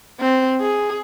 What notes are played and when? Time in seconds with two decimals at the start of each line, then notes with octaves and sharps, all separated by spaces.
0.20 C4
0.61 G#4